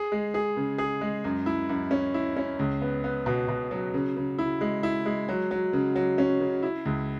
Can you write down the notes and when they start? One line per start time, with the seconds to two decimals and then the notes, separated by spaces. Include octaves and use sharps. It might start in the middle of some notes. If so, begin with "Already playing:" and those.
Already playing: G#4
0.12 G#3
0.34 G#4
0.57 C#3
0.78 G#4
1.01 G#3
1.24 F#2
1.46 E4
1.69 F#2
1.91 C#4
2.14 E4
2.37 C#4
2.59 C#2
2.81 B3
3.04 B3
3.26 B2
3.48 B2
3.71 F#3
3.94 C#3
4.16 C#3
4.39 E4
4.61 G#3
4.83 E4
5.06 G#3
5.29 F#3
5.51 F#3
5.73 C#3
5.96 F#3
6.18 C#4
6.40 C#3
6.63 E4
6.85 C#2